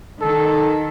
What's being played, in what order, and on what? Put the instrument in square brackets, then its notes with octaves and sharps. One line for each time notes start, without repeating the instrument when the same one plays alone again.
[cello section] D#3 [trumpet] A4